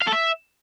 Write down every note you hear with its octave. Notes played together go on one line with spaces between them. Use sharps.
F5
A4
E5